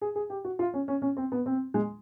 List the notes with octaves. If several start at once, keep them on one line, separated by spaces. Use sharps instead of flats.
G#4
G#4
G4
F#4
F4
C#4
C#4
C#4
C4
B3
C4
G#3